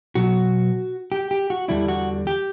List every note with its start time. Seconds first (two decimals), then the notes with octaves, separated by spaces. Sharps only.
0.15 B2 F#3 B3 F#4
1.12 G4
1.31 G4
1.50 F#4
1.68 E2 D3 G3 D4 E4
1.88 F#4
2.27 G4